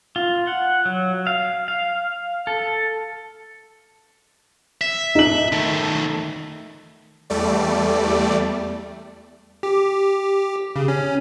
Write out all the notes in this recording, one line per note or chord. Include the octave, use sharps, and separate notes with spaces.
F4
F#5
F#3
F5
F5
A4
E5
D#4 F#7
D#3 A3
E2 G3 A3 D5
G4
C#3
C#4